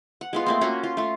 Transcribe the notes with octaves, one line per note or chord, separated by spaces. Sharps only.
F#5
G#3 B3 F4
A3 A#3 C4
A#3 C#4 F4 F#4
F4
A3 F4